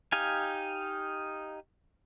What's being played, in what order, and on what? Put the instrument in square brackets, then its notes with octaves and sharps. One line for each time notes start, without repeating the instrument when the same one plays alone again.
[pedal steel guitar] D#4 G4 F5 G#5